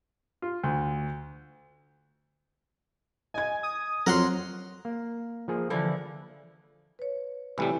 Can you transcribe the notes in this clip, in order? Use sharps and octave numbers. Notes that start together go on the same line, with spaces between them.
F4
D2
D#5 G#5 G#6
D#6
F2 F#3 A#4 F#5 C6
A#3
F3 A#3 G#4
D3 E3 F3 A4
B4 C#5
C2 A2 E3 G3 G4